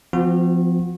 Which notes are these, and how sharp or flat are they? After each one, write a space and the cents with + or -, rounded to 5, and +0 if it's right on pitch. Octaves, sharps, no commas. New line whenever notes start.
F3 +0 C4 -35 F#4 -40